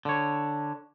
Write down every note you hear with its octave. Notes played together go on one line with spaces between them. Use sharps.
D3 C#5